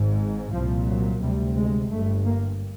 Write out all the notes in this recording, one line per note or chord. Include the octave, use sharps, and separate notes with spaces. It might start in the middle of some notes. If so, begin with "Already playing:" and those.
Already playing: G#1 G#2
C2 A#2 F3
F#3
D2 C3 G3
G#3
G1 G2 A3
A#3